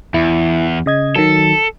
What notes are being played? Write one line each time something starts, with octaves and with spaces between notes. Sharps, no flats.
E2 E4
C#3 D#5 G#6
D#3 F#3 A4